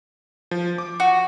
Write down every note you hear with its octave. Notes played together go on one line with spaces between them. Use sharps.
F3
D6
F#4